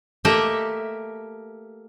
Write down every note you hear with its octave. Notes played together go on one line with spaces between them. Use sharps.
A3 A#3 G4 D#5 E5